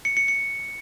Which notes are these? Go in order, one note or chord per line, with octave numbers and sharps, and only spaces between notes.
C#7
C#7
C#7